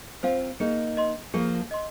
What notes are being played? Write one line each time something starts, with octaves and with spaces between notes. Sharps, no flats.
C4 F4 C5 F5
A#3 D#4 G#4
D#5 C6
F3 A#3 G#4
D#5 C6